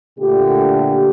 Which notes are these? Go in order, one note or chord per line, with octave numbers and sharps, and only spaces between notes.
A#2 D3 A3 G4